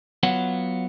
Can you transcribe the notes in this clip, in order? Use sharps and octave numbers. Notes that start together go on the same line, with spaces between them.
F#3 B3 F4 C#5 F#5